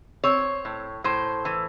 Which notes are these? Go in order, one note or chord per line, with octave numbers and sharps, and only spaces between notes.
C4 C#5
A2
A2 C5
E3